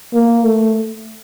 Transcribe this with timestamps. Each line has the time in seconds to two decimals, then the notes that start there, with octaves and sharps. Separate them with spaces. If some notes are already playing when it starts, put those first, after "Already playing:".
0.14 A#3
0.45 A3